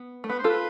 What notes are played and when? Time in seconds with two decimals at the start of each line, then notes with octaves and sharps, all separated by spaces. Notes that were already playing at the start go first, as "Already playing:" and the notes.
Already playing: B3
0.24 A3
0.29 B3 B4
0.39 C5
0.44 F4 A4 B4